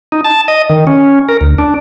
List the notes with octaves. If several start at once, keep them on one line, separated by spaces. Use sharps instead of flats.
D#4
A5
D#5
D#3
C#4
A#4
D2
D4